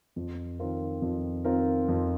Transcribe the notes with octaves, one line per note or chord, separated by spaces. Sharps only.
F2
D#3 C4 F4 A#4
F2
D#3 C4 F4 A#4
F2